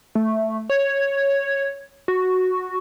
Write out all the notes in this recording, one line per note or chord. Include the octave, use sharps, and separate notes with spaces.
A3
C#5
F#4